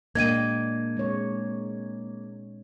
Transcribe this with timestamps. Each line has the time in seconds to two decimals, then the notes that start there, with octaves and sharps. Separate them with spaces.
0.15 A#2 G#3 A#3 D4 D#5 G5 G#6 D#7
0.97 G#3 C4 C#5